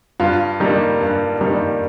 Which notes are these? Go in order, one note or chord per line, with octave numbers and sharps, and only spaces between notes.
G2 F4
D#3 G3 A#3
G2
D#3 G3 A#3